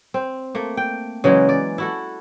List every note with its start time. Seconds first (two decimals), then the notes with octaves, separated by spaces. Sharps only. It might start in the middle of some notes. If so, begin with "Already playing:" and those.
0.14 C4
0.55 A3 A#3
0.77 G5
1.24 C#3 E3 F#3 G#3
1.49 D5
1.78 E4 F#4 A4